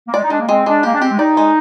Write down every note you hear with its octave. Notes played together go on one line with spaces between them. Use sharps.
A#3
G#3 D5
D#4
G#3 D4
A#3
G#3 C4
G#3 D4
A#3 G4
D4
C4 G4
G#3
D#4 D5
G#3